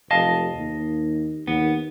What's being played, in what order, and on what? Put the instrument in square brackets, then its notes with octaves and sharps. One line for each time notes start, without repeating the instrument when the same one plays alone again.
[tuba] F1 [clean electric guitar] D#5 F5 A5
[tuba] D#2
[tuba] D#2 [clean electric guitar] B3